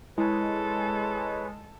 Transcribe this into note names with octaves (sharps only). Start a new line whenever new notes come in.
G#3 E4 A4 B4 C#5